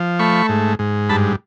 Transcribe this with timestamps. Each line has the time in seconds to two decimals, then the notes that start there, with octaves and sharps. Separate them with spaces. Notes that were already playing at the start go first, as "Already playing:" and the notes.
Already playing: F3
0.19 A3 B5 C#6
0.49 G#2
0.79 G#2
1.09 G2 A5 B5